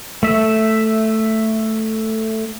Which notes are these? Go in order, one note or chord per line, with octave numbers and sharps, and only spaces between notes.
A3 E5